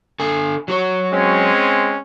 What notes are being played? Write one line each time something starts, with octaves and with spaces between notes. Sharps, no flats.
D3 A4 G#5
F#3 F#4 C#5
G#3 C4 C#4